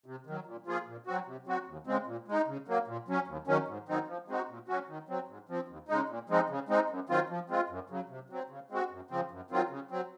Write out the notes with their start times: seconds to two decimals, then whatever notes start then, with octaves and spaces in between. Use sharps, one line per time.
0.06 C3
0.27 D#3 F#3
0.46 A#2
0.66 F3 A#3 F4 G#4
0.87 A#2
1.06 F#3 C4 F#4
1.27 C3
1.47 F#3 C4 F#4
1.68 D#2
1.87 C#3 G#3 C4
2.07 A#2
2.28 G#3 D#4
2.47 C#3
2.68 F#3 A#3
2.87 A#2
3.08 F#3 C#4
3.28 D#2
3.47 D#3 F#3 C#4
3.68 G#2
3.88 D#3 F#3 C4 D#4
4.08 F3
4.28 G#3 C4 D#4 F#4
4.49 A#2
4.68 F#3 C#4 F#4
4.88 D#3
5.09 F#3 C4
5.28 G#2
5.49 F3 C4
5.68 D#2
5.89 C#3 G#3 D#4
6.09 A#2
6.29 F3 G#3 C4 D#4
6.50 C#3
6.69 G#3 C4 D#4
6.90 F#2
7.09 D#3 F#3 C4 F4
7.30 F3
7.50 G#3 C4 F4
7.69 F#2
7.90 C#3 F#3
8.09 C3
8.30 F#3 C4
8.50 C#3
8.70 G#3 C4 F#4
8.91 F#2
9.10 C#3 F3 C4
9.31 F#2
9.50 D#3 F#3 C4 F4
9.70 C#3
9.91 F#3 C4